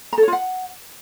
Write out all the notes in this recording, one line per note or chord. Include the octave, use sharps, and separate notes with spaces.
A#5
A4
C#5
F4
F#5